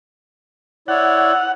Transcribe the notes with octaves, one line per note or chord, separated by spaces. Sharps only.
E4 C#5 D5 F#5